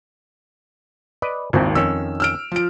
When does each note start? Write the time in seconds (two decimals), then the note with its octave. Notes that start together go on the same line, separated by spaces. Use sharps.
1.22 B4 D5 D#5
1.53 G#1 D#2 C4 E4
1.75 F2 D#3 C#4 E6
2.20 E6 F6 D7
2.52 F3 D7